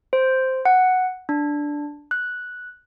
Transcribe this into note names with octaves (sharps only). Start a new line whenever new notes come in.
C5
F#5
D4
F#6